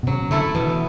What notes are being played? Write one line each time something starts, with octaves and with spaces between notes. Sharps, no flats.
B2
C#3 F#3
D3 A3 E4 A4
B2 E3